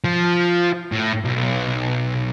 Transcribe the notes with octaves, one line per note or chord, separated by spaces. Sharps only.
F3
A2
B1